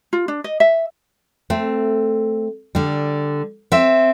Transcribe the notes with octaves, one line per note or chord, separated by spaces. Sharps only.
F4
D4
D#5
E5
A3 C4
D3 G3
C4 E5